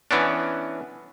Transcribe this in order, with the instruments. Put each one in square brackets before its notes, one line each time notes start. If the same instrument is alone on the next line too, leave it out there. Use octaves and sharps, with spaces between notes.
[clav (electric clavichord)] E3 B3 C#4 D4